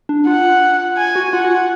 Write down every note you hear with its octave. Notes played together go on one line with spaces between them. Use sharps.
D4
F4 F#5
G#5
F#4
F4 F#5
F#4
F4